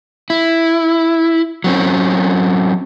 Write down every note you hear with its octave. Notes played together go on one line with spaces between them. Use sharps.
E4
F#3 C4 C#4